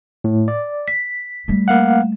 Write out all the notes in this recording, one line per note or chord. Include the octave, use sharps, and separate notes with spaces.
A2
D5
B6
G3 A3
A#3 F5 F#5